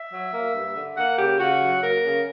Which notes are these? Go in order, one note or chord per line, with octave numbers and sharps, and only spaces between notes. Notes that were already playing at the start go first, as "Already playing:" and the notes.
Already playing: E5
F#3
A#3
G2
D3
A#3 F#5
C#3 G4
C#3 F#4
F#3
A#3 A#4
C#3